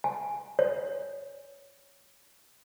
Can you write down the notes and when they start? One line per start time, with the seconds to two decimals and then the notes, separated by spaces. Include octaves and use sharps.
0.04 G#5
0.59 C#5